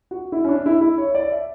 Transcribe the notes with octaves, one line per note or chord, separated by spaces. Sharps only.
F#4
E4
C#4
D4
E4
E4
C#5
D5
E5